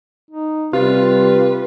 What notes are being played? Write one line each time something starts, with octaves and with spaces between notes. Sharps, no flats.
D#4
C3 G3 F4 B4